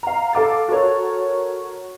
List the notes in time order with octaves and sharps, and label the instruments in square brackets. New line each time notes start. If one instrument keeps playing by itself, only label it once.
[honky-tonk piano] F5 A#5
A4 F5 D6 A6
F#4 A4 A#4 C#5